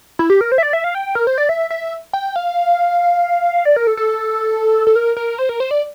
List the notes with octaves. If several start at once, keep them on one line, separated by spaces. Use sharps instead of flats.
E4
G4
A#4
C5
E5
D5
E5
F5
G5
A#4
C5
D5
E5
E5
G5
F5
D5
A#4
A4
A4
A4
A#4
A#4
C5
A#4
C5
D5